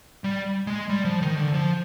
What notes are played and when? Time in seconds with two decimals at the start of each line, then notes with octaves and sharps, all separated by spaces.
0.24 G3
0.67 G#3
0.89 G3
1.05 F3
1.21 D#3
1.37 D3
1.54 F3